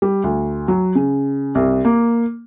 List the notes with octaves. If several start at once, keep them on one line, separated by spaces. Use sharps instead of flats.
G3
D2
F#3
C#3
C2
A#3